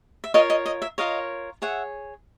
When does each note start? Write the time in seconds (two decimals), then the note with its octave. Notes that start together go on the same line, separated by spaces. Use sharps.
0.24 E5
0.34 F4 A#4 C#5 D#5 F5
0.50 D#5
0.66 D#5
0.82 E5
0.98 F4 A#4 C#5 D#5 F5
1.62 G#4 C#5 E5 F#5